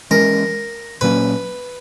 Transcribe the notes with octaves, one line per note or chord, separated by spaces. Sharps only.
E3 G#3 C#4 A#4
A#2 F#3 A#3 C#4 B4